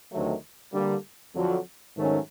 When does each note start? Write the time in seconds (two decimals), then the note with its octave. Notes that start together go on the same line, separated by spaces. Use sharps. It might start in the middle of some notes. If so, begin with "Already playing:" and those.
0.11 D2 C3 D#3 F#3 A3
0.73 D3 G3 A#3
1.35 F2 D3 F#3
1.97 G#2 D#3 F#3 A3 C#4